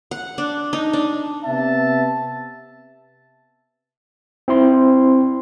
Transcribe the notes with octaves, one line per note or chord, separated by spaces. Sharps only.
F#5
D4
D#4
D4
C3 B3 E5 A5
C4 E4 C6